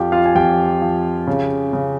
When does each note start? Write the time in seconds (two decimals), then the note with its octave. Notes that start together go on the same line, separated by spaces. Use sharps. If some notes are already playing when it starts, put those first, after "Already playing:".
Already playing: F2 F3 F4 G4 F5 G5
0.12 F4 F5
0.26 G#5
0.35 F2 G4 G5
0.82 F3
1.27 C#3
1.73 C#3